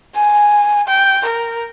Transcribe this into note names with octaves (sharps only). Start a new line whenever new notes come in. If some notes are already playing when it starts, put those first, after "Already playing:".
G#5
G5
A#4